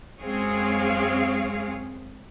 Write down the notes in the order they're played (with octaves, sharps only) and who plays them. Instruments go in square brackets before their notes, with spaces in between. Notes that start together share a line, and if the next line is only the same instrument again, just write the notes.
[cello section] F#2 G#3 C4 G#4 C#5 F5